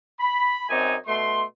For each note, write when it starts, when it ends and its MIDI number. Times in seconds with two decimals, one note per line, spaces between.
0.20 0.67 83
0.69 0.96 42
0.69 0.96 60
0.69 0.96 63
0.69 0.96 74
0.69 0.96 80
1.07 1.43 47
1.07 1.43 57
1.07 1.43 84